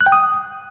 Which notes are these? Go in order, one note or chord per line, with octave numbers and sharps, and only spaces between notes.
F#6
G5
D#6